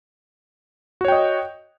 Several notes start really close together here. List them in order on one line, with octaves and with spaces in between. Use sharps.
F#4 C#5 G5 D#5